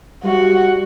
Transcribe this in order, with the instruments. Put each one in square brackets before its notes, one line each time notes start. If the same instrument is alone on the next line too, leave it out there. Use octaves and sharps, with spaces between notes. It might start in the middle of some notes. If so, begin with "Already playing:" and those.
[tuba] G3 [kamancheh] F#4 F#5